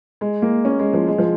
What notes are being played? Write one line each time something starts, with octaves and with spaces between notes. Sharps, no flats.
G#3
A#3
C#4
G#3
F3
G#3
F3